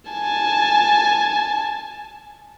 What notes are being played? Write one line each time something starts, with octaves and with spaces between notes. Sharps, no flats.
G#5 A5